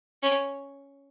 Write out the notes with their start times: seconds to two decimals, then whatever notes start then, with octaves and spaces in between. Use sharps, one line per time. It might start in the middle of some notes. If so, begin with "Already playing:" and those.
0.23 C#4